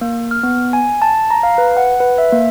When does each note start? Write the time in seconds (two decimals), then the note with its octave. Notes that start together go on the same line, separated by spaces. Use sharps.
0.01 A#3
0.31 F6
0.43 B3
0.73 G#5
1.02 A5
1.30 A#5
1.43 F5
1.58 B4
1.77 F#5
2.00 B4
2.18 E5
2.32 A#3